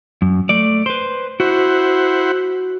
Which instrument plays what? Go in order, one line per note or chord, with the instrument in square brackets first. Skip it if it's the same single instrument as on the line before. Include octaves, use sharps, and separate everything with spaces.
[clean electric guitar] F#2
A3 D5
B4 C5
[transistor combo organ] E4 C5 F#5 [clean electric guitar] F#4